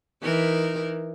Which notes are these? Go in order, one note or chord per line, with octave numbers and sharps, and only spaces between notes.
E3 D#4 A#4